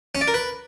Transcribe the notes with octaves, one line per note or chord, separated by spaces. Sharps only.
C#4
D5
A#4
B4